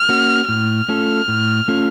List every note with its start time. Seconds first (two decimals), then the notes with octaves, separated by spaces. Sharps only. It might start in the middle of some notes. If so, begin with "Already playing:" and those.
Already playing: F6
0.09 A#3 C#4 F#4
0.49 A2 F6
0.89 A3 C#4 F4 A4
1.28 A2
1.68 A3 C#4 F4 A4